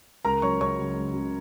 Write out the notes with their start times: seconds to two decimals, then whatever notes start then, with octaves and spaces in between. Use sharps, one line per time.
0.24 C#2 A#4 A#5
0.42 C#3 F#3 C#5 C#6
0.60 C#2 C#5 C#6
0.79 C#3 F#3
0.96 C#2
1.14 C#3 F#3